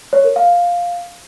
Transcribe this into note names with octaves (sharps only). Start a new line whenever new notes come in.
C#5
A#4
F5